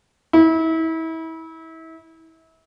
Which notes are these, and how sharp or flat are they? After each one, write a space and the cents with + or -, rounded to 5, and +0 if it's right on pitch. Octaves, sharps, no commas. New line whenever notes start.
E4 -30